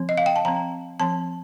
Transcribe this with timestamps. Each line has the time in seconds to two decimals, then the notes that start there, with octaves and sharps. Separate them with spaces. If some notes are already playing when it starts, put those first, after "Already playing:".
Already playing: F3 C4
0.09 D#5
0.17 F5
0.26 G5
0.36 A5
0.45 F3 C4 A#5
1.00 F3 C4 A5